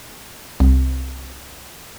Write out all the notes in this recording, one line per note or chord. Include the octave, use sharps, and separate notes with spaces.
C2